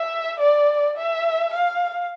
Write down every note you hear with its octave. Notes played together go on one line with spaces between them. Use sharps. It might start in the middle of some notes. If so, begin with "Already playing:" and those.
Already playing: E5
D5
E5
F5